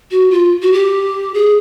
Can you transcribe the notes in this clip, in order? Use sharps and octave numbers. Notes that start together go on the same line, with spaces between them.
F#4
F4
F#4
G4
G#4